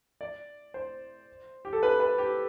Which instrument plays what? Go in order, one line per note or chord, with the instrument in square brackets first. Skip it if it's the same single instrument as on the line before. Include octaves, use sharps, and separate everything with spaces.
[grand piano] D5
C5
G4
A4
B4
B4
G4